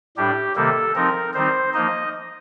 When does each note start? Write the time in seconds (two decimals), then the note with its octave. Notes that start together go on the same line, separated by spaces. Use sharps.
0.17 A2 G3 D4 G4
0.56 C3 D#3 G3 A#3 A4
0.95 F3 C4 D#4 A#4
1.34 D#3 G3 C4 D#4 C5
1.73 F3 A#3 D#4 D#5